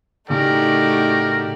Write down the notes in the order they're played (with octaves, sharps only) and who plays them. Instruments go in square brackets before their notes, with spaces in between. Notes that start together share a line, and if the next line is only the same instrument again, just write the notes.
[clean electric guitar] A2 C#3 [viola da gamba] A3 D#4 F#4 [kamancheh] G4 D5 [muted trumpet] A#4